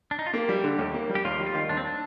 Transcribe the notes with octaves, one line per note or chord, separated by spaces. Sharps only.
D4
D#4
F4
A#3 G4
G3
D3
D#2
A#3
G3
G4
D#2 F4
G3
F4
D#3
D#2 D4
C4
D4